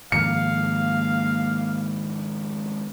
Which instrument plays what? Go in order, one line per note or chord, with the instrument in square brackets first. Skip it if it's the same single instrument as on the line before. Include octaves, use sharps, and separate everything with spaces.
[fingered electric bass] G#2 D#3 F3 [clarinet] A#3 [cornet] F5 [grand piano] C#7